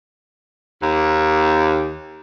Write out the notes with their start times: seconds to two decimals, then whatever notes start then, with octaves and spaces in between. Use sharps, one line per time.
0.80 D#2